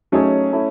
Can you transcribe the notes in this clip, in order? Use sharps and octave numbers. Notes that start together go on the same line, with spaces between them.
F#3 A3 C#4 D#4 G#4 C#5
A3 E4 A4